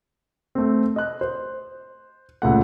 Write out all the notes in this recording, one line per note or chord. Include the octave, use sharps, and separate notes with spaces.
A3 C4
D#5 F#6
C5
D#1 C#2 A3 F#5